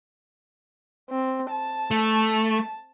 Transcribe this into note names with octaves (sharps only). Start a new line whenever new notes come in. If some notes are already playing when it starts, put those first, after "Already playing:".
C4
A5
A3